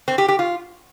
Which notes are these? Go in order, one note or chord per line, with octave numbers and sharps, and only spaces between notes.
C4
G4
G4
F4